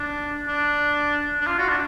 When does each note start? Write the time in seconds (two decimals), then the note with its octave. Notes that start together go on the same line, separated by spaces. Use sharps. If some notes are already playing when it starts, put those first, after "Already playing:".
Already playing: D4
0.48 D4
1.41 D4
1.47 F4
1.58 F#4
1.69 D4